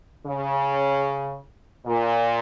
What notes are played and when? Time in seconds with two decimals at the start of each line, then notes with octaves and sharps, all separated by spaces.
0.25 C#3
1.86 A#2